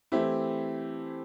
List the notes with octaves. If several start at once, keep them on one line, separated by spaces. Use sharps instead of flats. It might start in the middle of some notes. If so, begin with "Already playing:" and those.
E3 A3 C4 E4 G4